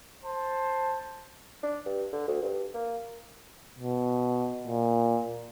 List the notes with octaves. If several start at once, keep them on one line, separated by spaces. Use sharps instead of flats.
C5 A5
D4
G2
D3
D2
G2
A#3
B2
A#2